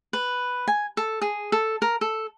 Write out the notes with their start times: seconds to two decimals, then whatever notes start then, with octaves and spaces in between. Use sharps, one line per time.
0.13 B4
0.68 G#5
0.97 A4
1.22 G#4
1.52 A4
1.82 A#4
2.01 A4